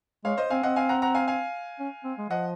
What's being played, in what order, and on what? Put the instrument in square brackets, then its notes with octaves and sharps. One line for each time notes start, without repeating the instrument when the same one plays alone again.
[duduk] G#3 [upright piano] C#5 F5
[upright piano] C5 D#5
[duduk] C4 [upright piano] F5 G#5
[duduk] C4 [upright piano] D#5 F#5
[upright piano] F5 G#5
F#5 A#5
F#5 A#5
F5 G#5
F5 G#5
[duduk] C#4
C4
G#3
[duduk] F3 [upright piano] D#5 F#5